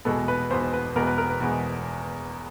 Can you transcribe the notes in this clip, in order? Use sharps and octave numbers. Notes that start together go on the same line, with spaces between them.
E2 B2 G#3 B3 A4
B4
E2 B2 G#3 B3 C5
B4
E2 B2 G#3 B3 A#4
B4
A#4
B4
E2 B2 G#3 B3